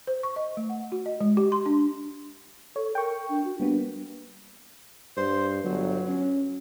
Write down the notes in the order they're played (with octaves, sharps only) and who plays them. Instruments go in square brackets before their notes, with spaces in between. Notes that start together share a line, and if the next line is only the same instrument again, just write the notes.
[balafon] C5
C#6
D#5
A3
F#5
F#4
D#5
G#3
G4
C6
D4
[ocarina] A4 [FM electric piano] C#5
[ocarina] A#4 [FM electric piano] G5 C#6
[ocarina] D4
F#4
[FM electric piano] G3 A#3 B3 [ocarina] D4
[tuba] G2 [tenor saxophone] C5
[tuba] G1 [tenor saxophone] F#3
[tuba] C#4